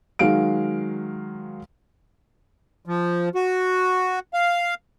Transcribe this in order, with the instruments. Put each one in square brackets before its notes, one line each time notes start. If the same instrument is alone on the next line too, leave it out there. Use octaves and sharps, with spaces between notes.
[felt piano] D#3 F#3 G#3 F5 D7
[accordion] F3
F#4
F5